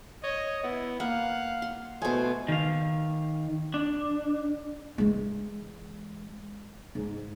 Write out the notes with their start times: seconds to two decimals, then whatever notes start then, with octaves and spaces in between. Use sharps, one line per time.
0.23 C#5 D#5
0.64 B3 E4
1.00 A#3 F5 F#5
1.62 C6
2.02 B2 A3 C5 G#5
2.48 D#3 F5
3.74 D4
4.98 E3 G#3
6.95 G#2